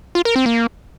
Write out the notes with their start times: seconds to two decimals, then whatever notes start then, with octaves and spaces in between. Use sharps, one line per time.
0.15 F4
0.25 A#4
0.36 C4
0.46 A#3